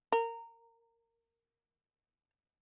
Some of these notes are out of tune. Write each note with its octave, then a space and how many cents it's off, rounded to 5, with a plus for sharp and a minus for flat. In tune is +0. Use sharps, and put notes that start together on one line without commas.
A#4 -15